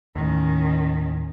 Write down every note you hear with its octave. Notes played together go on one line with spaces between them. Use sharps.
D#2 A2 D#3 C#4